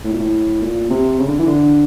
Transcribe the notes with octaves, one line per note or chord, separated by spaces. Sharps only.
A2
A#2
A2
A#2
C3
C#3
D3
E3
D3